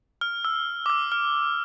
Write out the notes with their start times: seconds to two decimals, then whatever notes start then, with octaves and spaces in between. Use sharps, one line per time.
0.21 F6
0.45 E6
0.86 D6
0.90 E6
1.12 F6